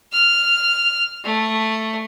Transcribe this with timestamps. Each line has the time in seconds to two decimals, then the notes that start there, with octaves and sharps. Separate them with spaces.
0.12 F6
1.24 A3